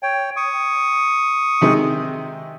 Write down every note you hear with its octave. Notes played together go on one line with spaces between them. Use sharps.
C#5 G5
C#6 D#6
C3 D#3 G#3